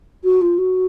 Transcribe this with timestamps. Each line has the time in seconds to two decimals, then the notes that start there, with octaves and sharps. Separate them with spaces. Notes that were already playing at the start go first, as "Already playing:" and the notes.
0.24 F#4
0.41 F4
0.58 F#4